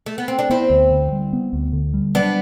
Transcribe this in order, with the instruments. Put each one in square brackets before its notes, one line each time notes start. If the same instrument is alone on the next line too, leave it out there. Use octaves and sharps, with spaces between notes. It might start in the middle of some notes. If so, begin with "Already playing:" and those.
[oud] A3
B3
C4
D4
[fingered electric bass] B3 [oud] C4 E4
[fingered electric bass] D2
D3
G3
B3
D2
D3
G3
[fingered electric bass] F#3 [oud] B3 D4